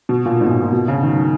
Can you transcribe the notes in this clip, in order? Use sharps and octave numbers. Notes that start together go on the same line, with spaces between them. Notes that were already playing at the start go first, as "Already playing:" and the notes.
B2
A#2
G#2
B2
A#2
A#2
B2
C#3
D#3
F#3